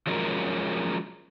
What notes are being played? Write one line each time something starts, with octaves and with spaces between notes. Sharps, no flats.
F3 F#3 G#3 C#4 A#4